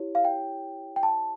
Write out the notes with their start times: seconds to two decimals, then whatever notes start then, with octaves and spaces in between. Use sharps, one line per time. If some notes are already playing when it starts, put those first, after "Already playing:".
Already playing: E4 G4 C#5
0.15 F5
0.25 G5
0.96 G5
1.03 A5